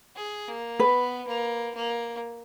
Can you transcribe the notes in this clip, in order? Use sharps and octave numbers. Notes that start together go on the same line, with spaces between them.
G#4
A#3
B3 B4
A#3
A#3